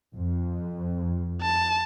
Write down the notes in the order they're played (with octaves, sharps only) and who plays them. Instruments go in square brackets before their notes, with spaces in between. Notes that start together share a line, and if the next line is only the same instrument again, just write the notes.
[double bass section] F2
[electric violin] A5